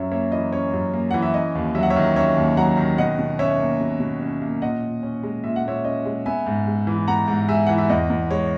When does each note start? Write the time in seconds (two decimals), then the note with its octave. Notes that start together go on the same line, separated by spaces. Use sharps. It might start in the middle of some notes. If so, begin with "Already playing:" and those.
Already playing: F#2 C#4 C#5 E5
0.11 A#3 C#5 E5
0.32 E3 D#5
0.52 C#4 C#5
0.74 F#2
0.94 A#3
1.11 E3 F#5
1.22 E5
1.34 C#4 D#5
1.55 D#2
1.75 F#3 E5
1.83 F#5
1.90 C#5 E5
1.96 D#3
2.16 C#4 C#5 E5
2.36 D#2
2.57 F#3 F#5 A#5
2.77 D#3
2.98 B2 D#5 F#5
3.19 B2
3.39 C#4 C#5 E5
3.59 A#3
3.80 B2
4.00 B2
4.21 C#4
4.42 A#3
4.62 A#2 D#5 F#5
4.83 A#2
5.03 C#4
5.23 G#3
5.44 A#2 E5
5.56 F#5
5.64 A#2 C#5 E5
5.85 C#4 D#5
6.05 G#3
6.26 B3 E5 G#5
6.46 G#2
6.67 G#3
6.87 E3
7.07 B3 F#5 A#5
7.28 G#2
7.48 G#3 E5 G#5
7.67 E3 F#5
7.78 E5
7.90 E2 D#5
8.10 E2
8.31 G#3 C#5